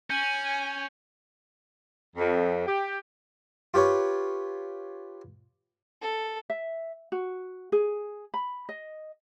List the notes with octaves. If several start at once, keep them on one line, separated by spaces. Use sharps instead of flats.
C#4 G#5 G6 F#7
F2
G4
F4 G4 B4 C#5
A4
E5
F#4
G#4
B5
D#5